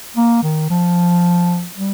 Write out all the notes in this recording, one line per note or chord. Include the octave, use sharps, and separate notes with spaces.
A#3
D#3
F3
G3